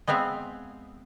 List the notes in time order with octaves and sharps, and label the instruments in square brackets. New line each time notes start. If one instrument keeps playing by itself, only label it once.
[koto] G#3 B3 C4 E5 F5